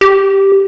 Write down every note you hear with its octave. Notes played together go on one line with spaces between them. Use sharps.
G4